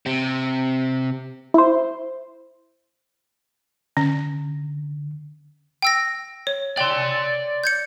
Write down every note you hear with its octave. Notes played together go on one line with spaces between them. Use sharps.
C3
E4 C5
D3 C#4
G5 E6 A#6
C#5
D5 G5 C6
G6 G#6 C#7